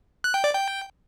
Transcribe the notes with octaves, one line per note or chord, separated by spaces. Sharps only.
F#6
G5
D5
G5